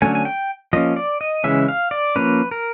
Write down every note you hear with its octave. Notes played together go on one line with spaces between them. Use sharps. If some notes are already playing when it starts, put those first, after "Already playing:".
D3 F#3 A3 C#4 G#5
G#5
G5
F3 A#3 C#4 D#5
D5
D#5
C#3 E3 G#3 C#4 E5
F5
D5
F3 A#3 C#4 B4
A#4